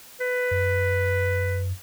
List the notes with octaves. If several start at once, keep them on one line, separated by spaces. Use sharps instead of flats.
B4
F#2